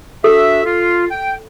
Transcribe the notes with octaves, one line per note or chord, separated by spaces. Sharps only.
D4 F#4 A4 E5
F4
G5